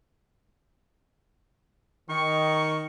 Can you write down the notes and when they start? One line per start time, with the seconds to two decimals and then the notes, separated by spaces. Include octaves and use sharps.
2.10 D#3 C#6